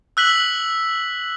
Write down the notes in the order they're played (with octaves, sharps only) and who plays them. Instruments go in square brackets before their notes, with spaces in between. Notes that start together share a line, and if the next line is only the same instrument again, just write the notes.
[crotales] E6 F#6 B6 F#7